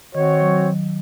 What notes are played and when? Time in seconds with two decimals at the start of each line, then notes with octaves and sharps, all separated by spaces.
0.15 D#3 C4 F#4 C#5
0.41 F#3